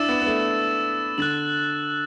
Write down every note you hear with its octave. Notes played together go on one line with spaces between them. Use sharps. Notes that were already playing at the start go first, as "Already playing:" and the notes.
Already playing: D4 E4 E6 A6 E7
B3
B3
A3
D3 F#6 A6 F#7